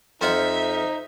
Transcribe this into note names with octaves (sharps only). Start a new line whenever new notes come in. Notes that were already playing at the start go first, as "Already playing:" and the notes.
F2 D#4 F4 C5 E5 F#5